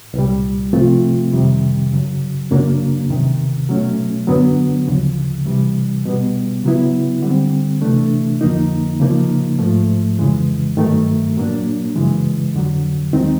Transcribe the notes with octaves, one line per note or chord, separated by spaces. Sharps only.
C2 A#2 G3
C3 F3 A3 C4 F4
F2 C3 D#3 G3
F#2 C#3 F#3
F#2 C#3 F#3 A#3 D4
E2 C3 D#3
B2 F#3 A3 C#4
F#2 D3 F#3 B3 D4
D2 C#3 F3
C3 E3 G3
B2 G3 B3
C#3 F#3 B3 E4
D3 G3 C4
C3 E3 A3 D4
F2 D3 F3 A#3 D#4
C#3 F3 A#3 D#4
G#2 F3 A3
F2 C#3 E3 G#3
G2 D#3 F#3 A3
A#2 F#3 A#3 D4
F#2 C#3 E3 G#3
F2 D3 F#3
D#2 D#3 G#3 C4 D#4